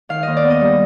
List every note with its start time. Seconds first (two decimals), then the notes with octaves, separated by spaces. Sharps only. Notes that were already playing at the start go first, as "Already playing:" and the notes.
0.09 D#3 F5
0.23 D#2 D#5
0.37 D5
0.44 B3
0.50 D#5
0.61 G3